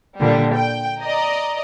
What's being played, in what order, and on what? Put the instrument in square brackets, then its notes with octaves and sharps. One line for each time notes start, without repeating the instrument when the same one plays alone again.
[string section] A#2 D3 G3
G5
D5 D#5 A#5